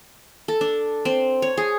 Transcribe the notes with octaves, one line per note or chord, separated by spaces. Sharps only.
A4
D4
C4
C#5
G#4